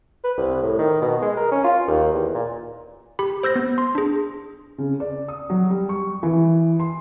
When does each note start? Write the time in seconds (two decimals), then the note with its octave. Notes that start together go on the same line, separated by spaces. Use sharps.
0.24 B4
0.37 C2
0.63 A2
0.79 D#3
1.02 B2
1.22 G#3
1.37 A#4
1.52 C#4
1.64 F4
1.87 D#2
2.13 E2
2.35 A#2
3.19 G4 B5
3.43 C5 E6 G6 A#6
3.56 B3
3.78 C6
3.95 D4 G#4
4.78 C#3
5.00 D5
5.28 D#6
5.50 F#3
5.70 G3
5.89 C#6
6.23 E3
6.80 C6